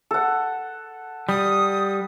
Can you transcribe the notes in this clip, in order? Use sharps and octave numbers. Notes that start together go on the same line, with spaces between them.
A4 F#5
G3 D#6